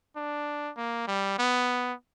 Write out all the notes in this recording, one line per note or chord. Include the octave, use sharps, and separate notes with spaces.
D4
A#3
G3
B3